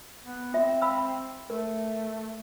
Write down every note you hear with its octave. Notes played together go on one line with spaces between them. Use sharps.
B3
C4 F4 E5
F5 B5 E6
A3 A#4